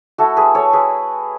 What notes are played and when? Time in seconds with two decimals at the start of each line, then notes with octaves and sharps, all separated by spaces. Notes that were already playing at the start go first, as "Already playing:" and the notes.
0.18 A3 E4 F#4 A4
0.36 G#4 B4
0.55 A4 C#5
0.73 G#4 B4